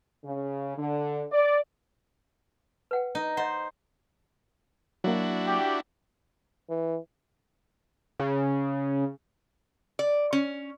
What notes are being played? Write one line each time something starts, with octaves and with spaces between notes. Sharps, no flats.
C#3
D3
D5
B4 F#5 G5
D#4
C5 D#5 F#5
F#3 A#3 D4 E4 F#4
G4
E3
C#3
D5
C#4